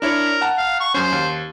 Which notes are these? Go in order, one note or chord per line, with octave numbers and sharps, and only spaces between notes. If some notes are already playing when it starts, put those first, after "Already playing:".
D4 E4 A#4 C#5
F#5 A5 A#5
F5
C#6
F#2 C#4 C5
D#2